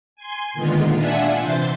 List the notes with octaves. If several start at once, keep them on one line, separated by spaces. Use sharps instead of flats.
G#5 C6
A#2 D3 D#3 G#3 B3 F4
D4 F4 E5 F#5 G#5
C3 E3 C5 G6 A6